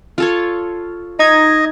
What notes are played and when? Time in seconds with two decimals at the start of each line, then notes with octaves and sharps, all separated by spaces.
0.18 F4 A4 C#5
1.19 D#4 D#5 G#6